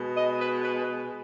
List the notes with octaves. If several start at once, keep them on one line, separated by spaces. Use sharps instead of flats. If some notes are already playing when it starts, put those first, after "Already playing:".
Already playing: B2 G#3
D#5
B4
B4